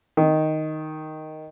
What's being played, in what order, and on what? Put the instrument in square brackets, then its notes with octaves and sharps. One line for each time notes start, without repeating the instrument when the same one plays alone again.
[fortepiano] D#3